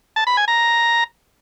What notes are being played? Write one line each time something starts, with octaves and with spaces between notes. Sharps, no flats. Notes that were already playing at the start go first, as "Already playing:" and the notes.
A5
B5
G#5
A#5